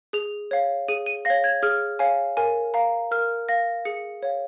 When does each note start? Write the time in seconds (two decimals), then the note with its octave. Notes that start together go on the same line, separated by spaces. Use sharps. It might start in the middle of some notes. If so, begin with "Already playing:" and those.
0.13 G#4 F7
0.51 C#5 F5
0.88 G#4 D#7
1.06 D#7
1.25 C#5 F5 A#6
1.44 G#6
1.63 G#4 F6
1.99 C#5 F5 G#5
2.37 A#4 G#5
2.74 F5 A#5
3.11 A#4 F6
3.49 F5 A#6
3.85 G#4 C#7
4.23 C#5 F5